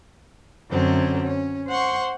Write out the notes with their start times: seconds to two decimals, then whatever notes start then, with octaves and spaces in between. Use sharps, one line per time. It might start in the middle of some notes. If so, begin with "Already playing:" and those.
0.70 F#2 D3 F#3 C4 C#4
1.26 C#4
1.67 C5 F#5 C6 C#6